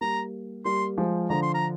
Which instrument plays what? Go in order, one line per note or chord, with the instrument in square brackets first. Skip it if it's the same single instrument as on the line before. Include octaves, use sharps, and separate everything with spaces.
[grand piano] G3 A#3 [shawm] A#5
[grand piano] G3 A#3 [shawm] C6
[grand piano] F3 G#3
[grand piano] D3 F3 [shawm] A#5
[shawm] C6
A#5